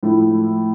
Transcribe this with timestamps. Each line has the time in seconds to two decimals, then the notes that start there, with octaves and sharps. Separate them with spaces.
0.03 A2 F3 A3 E4